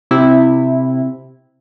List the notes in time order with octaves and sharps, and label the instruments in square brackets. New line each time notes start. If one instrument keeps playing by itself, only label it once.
[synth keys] C3 C4 E4